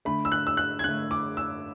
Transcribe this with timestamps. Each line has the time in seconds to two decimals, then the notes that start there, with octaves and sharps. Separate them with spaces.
0.05 D3 A3 B5
0.25 E6
0.32 F#6
0.47 E6
0.57 F#6
0.79 G#6
0.84 D3 A3 F#6
1.11 D6
1.37 E6